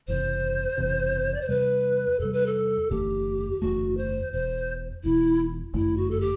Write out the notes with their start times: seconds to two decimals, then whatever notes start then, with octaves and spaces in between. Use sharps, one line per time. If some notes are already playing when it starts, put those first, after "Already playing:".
0.08 F#1 E2 C3 C5
0.78 F#1 E2 C3
1.34 D5
1.41 C5
1.48 E2 C3 G3 B4
2.19 E2 C3 G3 A4
2.33 B4
2.46 A4
2.90 F#1 E2 D3 A3 G4
3.61 F#1 E2 D3 A3 F#4
3.97 C5
4.33 E1 E2 B2 C5
5.04 E1 E2 B2 E4
5.74 G1 F#2 D3 A3 E4
5.97 F#4
6.11 A4
6.21 G4